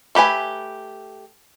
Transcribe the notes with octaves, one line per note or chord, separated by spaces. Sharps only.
A3 G4 B4 G#5